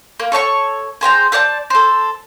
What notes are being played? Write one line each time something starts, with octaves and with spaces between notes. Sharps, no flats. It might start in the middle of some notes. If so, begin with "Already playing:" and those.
A#3
A4 C#5 E5 C#6
G#4 C5 G5 A#5
A4 C5 D5 A5
A4 C5